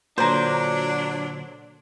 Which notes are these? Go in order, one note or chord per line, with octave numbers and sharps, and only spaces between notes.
A#2 D3 F#3 D4 C5 A#5